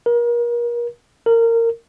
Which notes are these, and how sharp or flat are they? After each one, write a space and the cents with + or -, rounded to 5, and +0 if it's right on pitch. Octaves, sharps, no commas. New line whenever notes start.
A#4 +35
A#4 -20